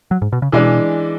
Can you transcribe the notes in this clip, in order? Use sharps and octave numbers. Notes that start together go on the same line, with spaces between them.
F#3
G#2
B2
C#3
B2 E3 G#3 D4